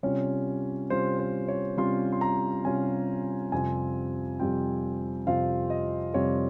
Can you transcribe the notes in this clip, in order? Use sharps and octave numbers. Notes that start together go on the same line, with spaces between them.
C3 G3 C#4 F4 C#5
C3 G3 C#4 F4 C5
C5
C#5
C3 G3 C#4 F4 C6
C6
A#5
C3 G3 C#4 F4 G#5
F2 C3 G3 C4 F4 G#5
F2 C3 G3 C4 F4 G5
F2 C3 G3 C4 F4 F5
D#5
F2 C3 G3 C4 F4 C#5